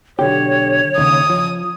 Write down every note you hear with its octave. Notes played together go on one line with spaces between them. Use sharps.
B1 D3 G4 C#5
D#2 A#2 C#3 D#6
F3